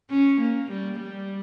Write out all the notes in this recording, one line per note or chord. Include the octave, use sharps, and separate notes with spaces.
C#4
A#3
G3
G3